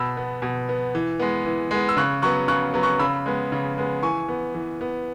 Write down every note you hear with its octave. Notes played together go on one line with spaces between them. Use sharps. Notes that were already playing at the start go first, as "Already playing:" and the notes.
Already playing: B2 B5 E6
B3
B2
B3
E3
G#3 B3
E3
G#3 B3
E6
C#3 C#6 F#6
F#3 B3 C#6 F#6
C#3 C#6 F#6
F#3 B3
C#6 F#6
C#3 B5 E6
G#3 B3
C#3
G#3 B3
E3 G#5 C#6
B3
E3
B3